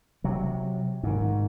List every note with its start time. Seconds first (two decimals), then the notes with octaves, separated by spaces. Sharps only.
0.24 C3 F#3
1.03 G#2 D#3